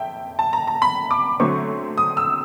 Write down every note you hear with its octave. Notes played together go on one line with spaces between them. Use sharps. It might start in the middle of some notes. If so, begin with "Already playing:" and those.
Already playing: F2 E5 G5
A5
A#5
A#5
B5
D6
D3 F#3 A3 C4 C#6
D#6
E6